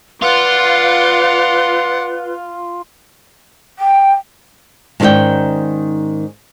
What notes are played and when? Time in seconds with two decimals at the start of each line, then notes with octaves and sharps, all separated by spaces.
0.22 F4 B4 D5 F#5
3.79 G5
5.00 G#2 D#3 C#4 G#4 D5 G5